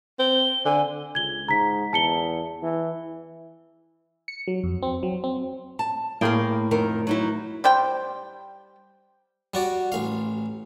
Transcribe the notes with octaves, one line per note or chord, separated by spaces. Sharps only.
C4 G7
D3 G#5
C#2 G#6 G7
G#2 A#5 B6
E2 A5 C#7 G7
E3
C#7
F#3
F2
C4
F#3
C4
A5
A2 A#3 G#4 A#4 F5 G5
F2 D#3 A#4
F#3 D#4 E4
G3 C5 G5
G3 F#4 D5
A1 F5